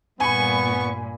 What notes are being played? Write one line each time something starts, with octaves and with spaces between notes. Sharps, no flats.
G2 A#2 B3 G#5 B5 C#6